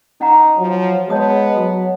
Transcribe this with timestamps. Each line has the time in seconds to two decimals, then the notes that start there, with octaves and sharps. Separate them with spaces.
0.21 C#4 D#4 F#5 A#5
0.58 F3 F#3
1.10 G#3 B3 C#5 A5 D#6
1.56 F#3